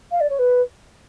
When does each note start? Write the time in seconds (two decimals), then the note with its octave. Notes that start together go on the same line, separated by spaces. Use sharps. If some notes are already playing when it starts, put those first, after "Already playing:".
0.11 F5
0.20 D5
0.29 C#5
0.39 B4